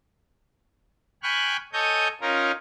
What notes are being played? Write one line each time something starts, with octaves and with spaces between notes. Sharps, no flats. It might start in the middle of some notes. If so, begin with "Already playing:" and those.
G5 G#5 B5 C#6 F6 F#6
A4 C#5 D#5 G#5 D#6 G6
C#4 D#4 F4 A#4